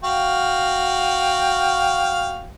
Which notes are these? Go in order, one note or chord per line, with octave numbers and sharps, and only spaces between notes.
F#4 F5 G5